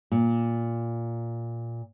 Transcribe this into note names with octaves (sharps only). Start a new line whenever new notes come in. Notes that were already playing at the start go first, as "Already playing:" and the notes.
A#2